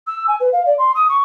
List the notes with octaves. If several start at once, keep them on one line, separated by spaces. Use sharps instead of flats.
E6
G#5
B4
F5
D5
C6
D#6
C#6